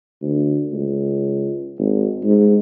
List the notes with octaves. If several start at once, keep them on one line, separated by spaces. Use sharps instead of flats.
D2
C#2
G#1
G#2